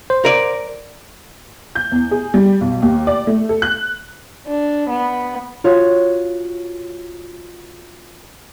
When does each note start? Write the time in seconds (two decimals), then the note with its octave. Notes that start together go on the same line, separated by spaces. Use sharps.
0.10 C5
0.25 A#4 D5
1.75 G6
1.92 E2
2.11 G#4
2.34 G3
2.61 B1
2.82 D#2
3.07 D5
3.27 A3
3.49 A4
3.62 F#6
4.47 D4
4.90 B3
5.64 F4 F#4 C#5